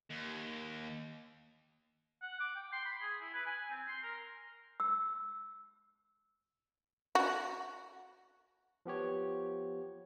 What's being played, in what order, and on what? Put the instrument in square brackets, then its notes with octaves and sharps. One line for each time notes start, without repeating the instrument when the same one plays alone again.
[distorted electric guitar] D#2
[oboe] F#5
D6
G5
C6
B5
G#4
E4
B4
G#5
C4
C6
A#4
[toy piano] E6
[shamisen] F#4
[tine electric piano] F3 B3 G4 C#5